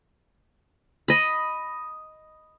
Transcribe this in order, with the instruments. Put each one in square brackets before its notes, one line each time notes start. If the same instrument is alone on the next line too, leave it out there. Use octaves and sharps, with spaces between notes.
[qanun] D#5 B5